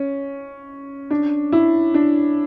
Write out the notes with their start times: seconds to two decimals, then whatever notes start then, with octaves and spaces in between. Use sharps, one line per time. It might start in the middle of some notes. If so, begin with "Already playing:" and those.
Already playing: C#4
1.10 D4
1.52 E4
1.94 D4